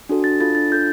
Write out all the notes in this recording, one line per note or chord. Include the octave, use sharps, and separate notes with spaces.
D4 F#4 A4
D4 A6
F4 A4 A6
D4 A6
F4 A4 G6